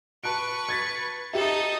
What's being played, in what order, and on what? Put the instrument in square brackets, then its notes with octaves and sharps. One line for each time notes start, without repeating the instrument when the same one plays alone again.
[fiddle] B4 C#6 [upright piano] A5 F#6 D7
[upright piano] G#6 A6 B6
[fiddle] D#4 A4 [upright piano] G4 E5